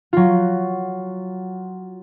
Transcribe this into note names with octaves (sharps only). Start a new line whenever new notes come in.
F#3 F4